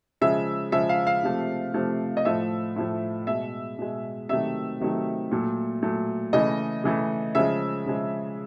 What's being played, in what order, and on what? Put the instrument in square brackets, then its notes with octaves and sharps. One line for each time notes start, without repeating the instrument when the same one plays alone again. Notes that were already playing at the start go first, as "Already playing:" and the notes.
[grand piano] C#3 F3 G#3 E5
C#3 F3 G#3 E5
F5
F5
C3 F3 A3
C3 F3 A3
D#5
A2 F3 A3 E5
A2 F3 A3
B2 G#3 E5
B2 G#3
C3 D#3 F#3 A3 E5
C3 D#3 F#3 A3
A#2 F#3 A3
A#2 F#3 A3
C#3 E3 A3 D#5
C#3 E3 A3
C#3 F3 G#3 E5
C#3 F3 G#3